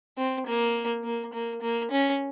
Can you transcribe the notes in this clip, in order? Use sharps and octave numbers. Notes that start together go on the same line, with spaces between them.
C4
A#3
A#3
A#3
A#3
C#4